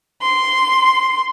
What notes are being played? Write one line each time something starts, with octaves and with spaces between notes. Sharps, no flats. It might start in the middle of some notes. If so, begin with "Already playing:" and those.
C6